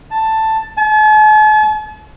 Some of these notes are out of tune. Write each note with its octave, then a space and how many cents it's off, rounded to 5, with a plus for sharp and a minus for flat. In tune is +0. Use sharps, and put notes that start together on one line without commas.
A5 +5
A5 -45